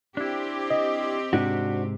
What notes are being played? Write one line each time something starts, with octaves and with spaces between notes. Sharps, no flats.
C4 D4 E4 G4
D#5
G#2 C3 D4 F#4